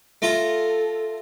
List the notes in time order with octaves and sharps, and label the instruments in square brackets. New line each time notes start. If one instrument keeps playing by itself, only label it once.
[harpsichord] A3 F4 A#5 [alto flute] A4